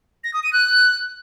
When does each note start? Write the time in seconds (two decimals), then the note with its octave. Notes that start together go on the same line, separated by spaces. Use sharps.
0.24 A#6
0.34 D#6
0.43 D#7
0.53 F#6